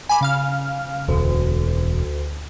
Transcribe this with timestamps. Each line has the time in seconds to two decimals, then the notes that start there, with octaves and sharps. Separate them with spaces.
0.09 G#5 B5 D6
0.21 C#3 F5 F6
1.08 E1 D2